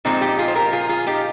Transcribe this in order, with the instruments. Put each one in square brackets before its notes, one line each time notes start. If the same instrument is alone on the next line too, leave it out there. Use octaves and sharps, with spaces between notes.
[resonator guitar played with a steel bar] A#2 F3 G#3 C4 D#4
D#4 G4
F4 G#4
C5
G4 A#4
F4 G#4
F4 G#4
D#4 G4